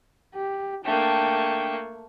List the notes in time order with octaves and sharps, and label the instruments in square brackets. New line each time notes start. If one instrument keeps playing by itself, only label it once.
[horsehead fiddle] G4
[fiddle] A3 A#3 [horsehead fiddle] D4 G5